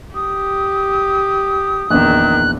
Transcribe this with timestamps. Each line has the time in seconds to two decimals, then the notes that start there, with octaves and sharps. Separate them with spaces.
0.15 G4 D#6
1.90 A#1 E2 D#3 F#6